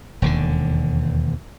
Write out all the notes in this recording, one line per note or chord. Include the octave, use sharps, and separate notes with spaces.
E1 D#2 D3